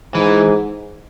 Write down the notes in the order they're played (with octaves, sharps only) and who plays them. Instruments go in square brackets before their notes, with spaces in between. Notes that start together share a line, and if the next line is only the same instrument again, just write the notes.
[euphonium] G#2 [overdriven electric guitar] E3